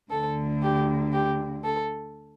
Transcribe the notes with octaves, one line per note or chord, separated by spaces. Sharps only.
D2 D3 A4
G4
G4
A4